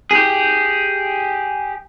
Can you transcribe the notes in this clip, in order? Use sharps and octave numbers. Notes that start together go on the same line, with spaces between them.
G4 G#4